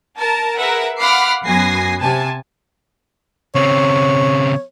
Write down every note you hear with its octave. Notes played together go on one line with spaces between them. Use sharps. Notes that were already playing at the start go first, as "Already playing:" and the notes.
A#4 A5
G#4 A#4 B4 E5 F#5
F5 F#5 B5 D6 F6 C7
F#2 B3 G#5 A#6 C7
C3 G#5 A5
C#3 C4 C#5